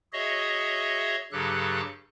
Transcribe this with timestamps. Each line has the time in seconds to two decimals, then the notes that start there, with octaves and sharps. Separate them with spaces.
0.13 F#4 G#4 C#5 D#5 E5
1.32 G2 C#3 F#3 G4 A4 F#6